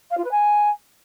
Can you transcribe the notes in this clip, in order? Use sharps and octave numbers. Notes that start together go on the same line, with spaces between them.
F5
F4
B4
G#5